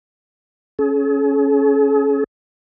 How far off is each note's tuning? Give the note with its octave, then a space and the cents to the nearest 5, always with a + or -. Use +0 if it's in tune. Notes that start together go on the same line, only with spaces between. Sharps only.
C#4 +0 G#4 +45